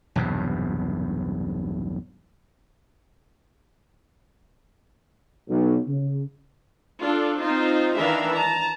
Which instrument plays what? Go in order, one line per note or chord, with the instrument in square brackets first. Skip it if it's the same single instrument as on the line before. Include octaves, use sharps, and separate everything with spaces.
[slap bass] B1 E2 G2 C3
[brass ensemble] B1
C#3
[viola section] D4 F4 A4
C4 D#4 F4 C5
D#3 E3 D4 E5 F5 A#5
A5 A#5